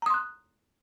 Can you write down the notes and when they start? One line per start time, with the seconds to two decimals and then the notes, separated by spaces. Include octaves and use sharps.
0.02 A#5
0.06 D#6
0.10 C6
0.14 F#6